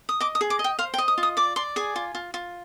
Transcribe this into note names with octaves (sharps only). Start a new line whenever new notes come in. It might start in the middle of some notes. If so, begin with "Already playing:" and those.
D#6
D#5 D6
D#6
G#4
D6
D#5
G5
C5 F5
G5
D#5
D#6
F4
D#6
D5 D6
D5 C6
G#4 G#5
F4
F4
F4